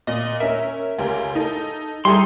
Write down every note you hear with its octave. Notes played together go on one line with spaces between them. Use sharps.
A#2 D#5
C#4 A#4 E5
C#2 G4 A#4
D#4 A4
G3 D#4 E4 G#4 A4 C6